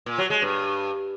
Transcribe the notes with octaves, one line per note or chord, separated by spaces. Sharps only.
A#2
F#3
G#3
G2